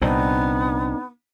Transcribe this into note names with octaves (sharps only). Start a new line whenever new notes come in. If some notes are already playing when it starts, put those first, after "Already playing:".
C2 A#2 B3 C4 D4 D#4